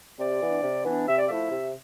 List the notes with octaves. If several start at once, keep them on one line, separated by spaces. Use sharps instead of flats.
C3 D5
E3 B3 D4
C3
E3 B3 D4
C3 E5
D5
F3 A3 E4 E5
C3